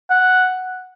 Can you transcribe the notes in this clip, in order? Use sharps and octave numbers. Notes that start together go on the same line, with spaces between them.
F#5